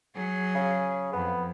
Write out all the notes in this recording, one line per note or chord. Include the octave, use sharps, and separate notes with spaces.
F#3 G#4
C#3
F2 B3